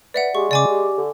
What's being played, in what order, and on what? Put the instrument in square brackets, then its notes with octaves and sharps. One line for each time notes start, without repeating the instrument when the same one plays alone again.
[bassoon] B4 [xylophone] D5 E5 F#5
[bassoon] G#3 [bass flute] G4 [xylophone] C#6
[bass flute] C#3 [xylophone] D5 G#5 D6
[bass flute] G4
[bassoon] D3